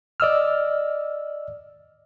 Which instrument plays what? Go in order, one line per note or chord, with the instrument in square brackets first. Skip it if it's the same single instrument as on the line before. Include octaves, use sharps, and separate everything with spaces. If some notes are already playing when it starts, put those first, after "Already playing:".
[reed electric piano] D5 D#5 E6 F6